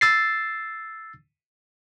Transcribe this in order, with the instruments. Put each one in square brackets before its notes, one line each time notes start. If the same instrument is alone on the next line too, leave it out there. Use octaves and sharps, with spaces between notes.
[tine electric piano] E6 A6 C7